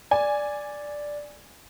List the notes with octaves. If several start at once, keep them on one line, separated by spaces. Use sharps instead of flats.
D5 G#5